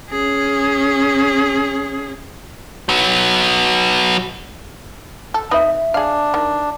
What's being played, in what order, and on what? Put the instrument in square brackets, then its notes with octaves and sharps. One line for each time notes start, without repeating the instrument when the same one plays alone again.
[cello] C#4 G#4
[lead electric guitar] F#3 B3
[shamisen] A4
[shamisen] C4 D#4 B4 [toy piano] E5 D#6
[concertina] D4 [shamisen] G#4 F5
[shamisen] D#3